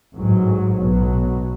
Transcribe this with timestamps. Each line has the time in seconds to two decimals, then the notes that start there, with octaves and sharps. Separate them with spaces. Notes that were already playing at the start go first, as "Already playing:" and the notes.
0.14 A1 G#2 F#3
0.75 B1 B2 F#3